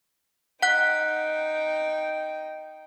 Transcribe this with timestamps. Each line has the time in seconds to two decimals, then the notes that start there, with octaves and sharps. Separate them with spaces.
0.62 D#4 F#5 G5 F#6